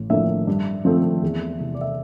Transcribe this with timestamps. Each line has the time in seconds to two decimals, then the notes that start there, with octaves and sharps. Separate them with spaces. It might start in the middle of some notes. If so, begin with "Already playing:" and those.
Already playing: A1
0.10 A2 F3 A#3 D4 E5
0.47 G2
0.85 F3 A3 C4
1.23 E2
1.60 C3 E3
1.74 D5
1.81 E5